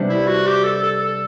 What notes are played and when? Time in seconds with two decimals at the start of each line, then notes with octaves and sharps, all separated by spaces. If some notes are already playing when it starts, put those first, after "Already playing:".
Already playing: C3 G3 B3 D4
0.09 E4
0.28 F#4
0.47 G4
0.64 A4
0.83 A4
1.01 A4